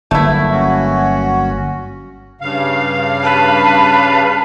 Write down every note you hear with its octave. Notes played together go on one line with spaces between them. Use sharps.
G1 F#3 A3 A#3 E4
C#4 F#4
G2 C#3 F5
B4 A5